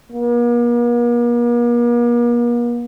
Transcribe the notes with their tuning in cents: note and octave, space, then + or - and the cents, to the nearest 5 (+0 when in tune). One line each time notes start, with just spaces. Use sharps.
A#3 +45